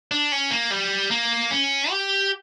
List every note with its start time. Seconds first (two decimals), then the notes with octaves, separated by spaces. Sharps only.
0.11 D4
0.32 C#4
0.51 A#3
0.71 G3
1.11 A#3
1.51 C#4
1.90 G4